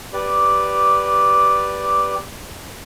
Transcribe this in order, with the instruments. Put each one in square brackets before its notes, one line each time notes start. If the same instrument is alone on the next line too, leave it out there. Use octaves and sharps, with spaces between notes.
[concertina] G4 B4 D5